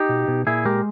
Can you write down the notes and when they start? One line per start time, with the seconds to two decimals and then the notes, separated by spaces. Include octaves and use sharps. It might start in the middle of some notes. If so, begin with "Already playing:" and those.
Already playing: D#4 G4
0.09 B2
0.28 B2
0.47 A#2 E4 G#4
0.65 G#3 G4 A#4